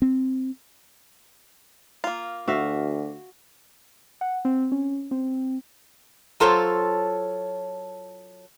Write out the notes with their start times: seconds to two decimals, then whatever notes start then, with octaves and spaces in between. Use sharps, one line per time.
0.02 C4
2.04 A#3 F4
2.48 D2 F#4 E5 F5
4.21 F#5
4.45 C4
4.72 C#4
5.11 C4
6.40 F#3 F4 A4 C5 C#5